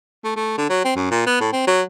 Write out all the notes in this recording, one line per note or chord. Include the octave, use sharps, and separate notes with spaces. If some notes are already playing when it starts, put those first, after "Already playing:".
A3
A3
D3
F#3
C4
F#2
A#2
B3
A2
C4
F#3